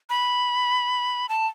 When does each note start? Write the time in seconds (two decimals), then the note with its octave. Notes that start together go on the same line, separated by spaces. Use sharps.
0.10 B5
1.29 A5